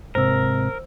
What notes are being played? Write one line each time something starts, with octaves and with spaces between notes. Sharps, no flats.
G#2 C3 A#4 C5 E6